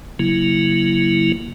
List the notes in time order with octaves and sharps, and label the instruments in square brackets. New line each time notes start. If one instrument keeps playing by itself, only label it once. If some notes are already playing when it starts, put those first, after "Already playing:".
[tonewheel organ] C#3 F#3 A#3 E4